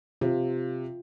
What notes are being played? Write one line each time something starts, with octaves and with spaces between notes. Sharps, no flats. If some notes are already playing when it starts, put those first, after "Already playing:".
C3 F4